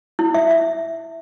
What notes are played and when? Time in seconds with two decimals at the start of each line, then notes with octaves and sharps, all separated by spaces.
0.19 E4
0.34 E5
0.51 E5